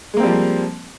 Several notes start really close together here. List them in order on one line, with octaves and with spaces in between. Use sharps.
G#3 A#3 C4 G3 F3